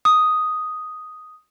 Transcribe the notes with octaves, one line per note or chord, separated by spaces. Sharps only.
D#6